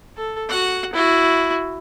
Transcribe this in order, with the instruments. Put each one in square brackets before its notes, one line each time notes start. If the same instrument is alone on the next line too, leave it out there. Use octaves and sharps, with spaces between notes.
[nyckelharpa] A4
F#4 F#5
E4 F#4